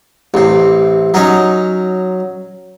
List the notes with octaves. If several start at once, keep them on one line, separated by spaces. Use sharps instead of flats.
A1 C3
F#3 C#4 D#4